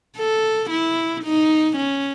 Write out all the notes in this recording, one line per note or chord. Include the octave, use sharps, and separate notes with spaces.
A4
E4
D#4
C#4